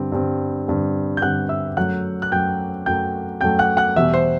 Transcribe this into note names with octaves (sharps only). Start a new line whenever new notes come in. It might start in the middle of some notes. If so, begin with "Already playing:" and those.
Already playing: G2 D3 G3 C4
G2 D3 G3 C4
G2 D3 G3 C4
G6
G2 D3 G3 C4 F#5 F#6
E5 E6
F#2 F#3 A3 F#5 F#6
F#6
F#2 F#3 A3 G5 G6
F#2 F#3 A3 G5 G6
F#2 F#3 A3 G5 G6
F#5 F#6
F#5 F#6
E2 B2 G3 E5 E6
C5 C6